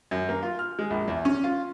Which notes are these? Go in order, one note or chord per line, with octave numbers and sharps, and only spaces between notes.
F#2
A#3
F4
F6
G#3
A#1
E2
C#4
F4